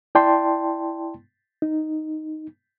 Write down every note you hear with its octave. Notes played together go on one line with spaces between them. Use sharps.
E4 D5 G5 A5 C6
D#4